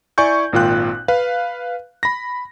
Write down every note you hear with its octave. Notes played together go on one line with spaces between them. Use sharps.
E4 D5 G#5 C#6 G6
G#1 A#2 F4 G5 F#6
B4 F5
B5 A#6